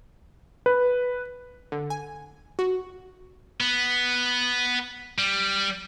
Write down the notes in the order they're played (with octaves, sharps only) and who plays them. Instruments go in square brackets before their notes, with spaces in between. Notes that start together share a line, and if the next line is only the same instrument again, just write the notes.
[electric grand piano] B4
[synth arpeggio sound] D3
G#5
F#4
[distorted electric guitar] B3
G3